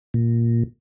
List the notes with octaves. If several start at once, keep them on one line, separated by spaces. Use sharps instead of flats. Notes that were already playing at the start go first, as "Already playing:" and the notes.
A#2